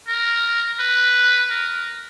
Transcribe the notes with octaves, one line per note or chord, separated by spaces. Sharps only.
A#4
B4
A#4